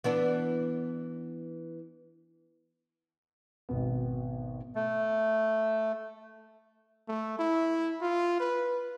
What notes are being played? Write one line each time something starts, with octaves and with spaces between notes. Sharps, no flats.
E3 B3 D4
G#1 B2 B3
A3
A3
E4
F4
B4